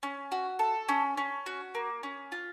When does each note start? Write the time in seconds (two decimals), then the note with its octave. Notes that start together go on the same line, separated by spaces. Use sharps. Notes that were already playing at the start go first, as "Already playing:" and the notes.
0.03 C#4
0.32 F#4
0.59 A4
0.89 C#4
1.17 C#4
1.46 F#4
1.75 A#3
2.03 C#4
2.32 F4